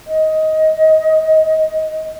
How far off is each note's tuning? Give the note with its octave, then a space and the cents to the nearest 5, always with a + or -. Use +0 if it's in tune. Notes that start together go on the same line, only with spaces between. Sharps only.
D#5 +15